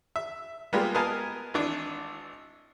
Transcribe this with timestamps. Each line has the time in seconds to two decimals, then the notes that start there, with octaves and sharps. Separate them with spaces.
0.16 E5
0.73 G3 G#3 A#3 B3 F4 G4
0.94 B3 A#4 D#5 F5 G#5 A5
1.54 G#1 E3 D4 D6